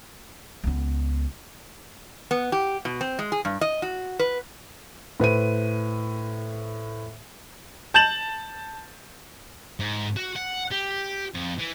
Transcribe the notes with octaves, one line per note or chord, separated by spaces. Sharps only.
C#2 B3
B3
G4
B2
C4
G#3
G#4
G2
D#5
F#4
B4
A2 B4 C5 D#7
A5 G6 A6 E7 F#7
G#2
F#4
F#5
G4
F2
E3